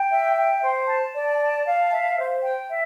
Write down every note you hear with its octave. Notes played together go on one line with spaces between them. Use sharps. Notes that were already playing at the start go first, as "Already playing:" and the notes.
Already playing: G5
E5
G5
C5
A5
D5
A5
F5
E5
C5
G5
E5